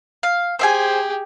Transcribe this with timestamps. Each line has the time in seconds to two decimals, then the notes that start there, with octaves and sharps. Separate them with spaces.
0.23 F5
0.59 G4 G#4 C5 E5 G#5